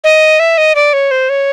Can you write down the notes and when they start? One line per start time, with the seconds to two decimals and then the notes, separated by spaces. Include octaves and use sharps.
0.04 D#5
0.40 E5
0.58 D#5
0.75 D5
0.93 C#5
1.11 C5
1.29 C#5